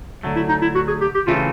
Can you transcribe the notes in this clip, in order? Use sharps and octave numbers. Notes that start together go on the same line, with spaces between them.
D2 D3 F#3 A3
E4
D#4
E4
F#4
G#4
G4
G4
C#3 E3 A3 C4 F4